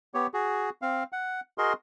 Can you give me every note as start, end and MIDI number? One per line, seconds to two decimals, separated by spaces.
0.14 0.27 59
0.14 0.27 67
0.14 0.27 73
0.34 0.70 66
0.34 0.70 68
0.82 1.04 60
0.82 1.04 77
1.12 1.41 78
1.58 1.73 66
1.58 1.73 68
1.58 1.73 70
1.58 1.73 75
1.58 1.73 84